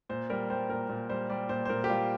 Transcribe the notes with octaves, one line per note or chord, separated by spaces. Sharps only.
A#2 C5
G3 A#4
G3 C5
A#2 A#4
A#2
G3 C5
G3 D5
A#2 C5
C5
A#2 A#4
G4
G3 F4